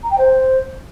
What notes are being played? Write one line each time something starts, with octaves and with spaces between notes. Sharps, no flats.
A#5
G5
C5